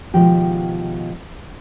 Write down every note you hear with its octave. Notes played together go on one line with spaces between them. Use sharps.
B2 D#3 F3 G#3 G4